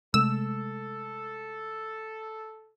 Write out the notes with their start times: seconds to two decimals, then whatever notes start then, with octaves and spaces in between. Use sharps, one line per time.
0.14 C3 G#3 A3 A4 E6